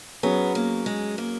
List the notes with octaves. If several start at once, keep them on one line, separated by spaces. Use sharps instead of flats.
F#3 B3 C#4 G#4
A#3
G#3
A#3